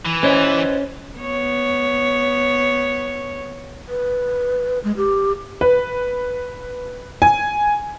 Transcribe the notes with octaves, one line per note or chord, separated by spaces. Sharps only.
E3
C#4 B4 C5 D#5
B3 C#5
B4
G#3
G4
B4
G#5